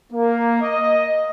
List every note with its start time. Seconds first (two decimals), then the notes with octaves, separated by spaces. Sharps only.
0.12 A#3
0.62 D#5